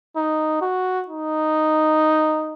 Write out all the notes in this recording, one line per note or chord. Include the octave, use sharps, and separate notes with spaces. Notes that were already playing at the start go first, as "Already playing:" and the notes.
D#4
F#4
D#4